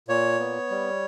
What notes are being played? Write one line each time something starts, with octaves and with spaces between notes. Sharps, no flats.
A#2 C#5
B3
G3